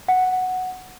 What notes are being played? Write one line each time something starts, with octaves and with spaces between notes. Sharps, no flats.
F#5